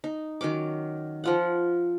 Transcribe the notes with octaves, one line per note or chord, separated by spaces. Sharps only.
D#4
D#3 F#3 C#4 D6
F3 F4 F#5